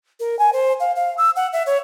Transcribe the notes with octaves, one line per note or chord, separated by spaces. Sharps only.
A#4
G#5
C5
F5
F5
E6
F#5
E5
C#5